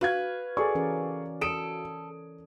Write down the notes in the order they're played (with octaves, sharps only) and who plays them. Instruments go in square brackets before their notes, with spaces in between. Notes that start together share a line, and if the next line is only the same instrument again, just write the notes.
[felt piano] F#4 F5 G#6 [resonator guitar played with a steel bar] B4
[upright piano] G#4 A4 C#6 [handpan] D5
[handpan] E3 C#4 A#4
[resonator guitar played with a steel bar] A4 [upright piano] D#6 D7